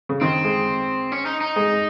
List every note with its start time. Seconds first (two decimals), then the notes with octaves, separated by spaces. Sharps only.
0.09 C#3
0.21 D#3 C4
0.44 G#3
1.12 C#4
1.26 D#4
1.41 D#4
1.56 G#3